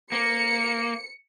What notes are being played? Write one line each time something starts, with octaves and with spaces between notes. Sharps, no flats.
A#3 C#7